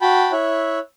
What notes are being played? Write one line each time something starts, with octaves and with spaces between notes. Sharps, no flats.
F#4 G5 A5 B5
E4 C#5 E5 F#6